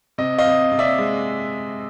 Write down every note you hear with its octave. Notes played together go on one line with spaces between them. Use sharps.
C3 D#5
D#5 F5
C3
C3
D5 E5
G#3